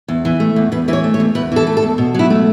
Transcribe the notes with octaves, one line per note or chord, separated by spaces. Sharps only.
E2
E3
A3
E2
E2 B4
E3 B4
C#5
A3
C#5
E2
E2 B4
E3 A4
A3
A4
E2
B2
F#3 E4
A3